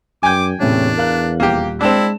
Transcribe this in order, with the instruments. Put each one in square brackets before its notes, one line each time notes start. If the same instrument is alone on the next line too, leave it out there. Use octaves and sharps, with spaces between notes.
[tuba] F#2 [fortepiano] G5 G#5 [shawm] D6
[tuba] E2 [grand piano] A2 C3 C#4 [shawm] D4
[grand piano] A#4 F5 F#6
[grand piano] D#1 [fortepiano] A#3 G4
[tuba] G#3 [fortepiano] C4 D4 [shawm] E4 [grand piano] A5 E7